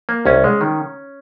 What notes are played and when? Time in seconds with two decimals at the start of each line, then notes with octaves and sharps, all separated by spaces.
0.09 A#3
0.26 C2 C#4
0.44 G#3
0.61 D#3